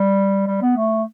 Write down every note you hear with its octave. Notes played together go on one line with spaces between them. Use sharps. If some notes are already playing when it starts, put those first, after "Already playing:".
Already playing: G3
G3
B3
A3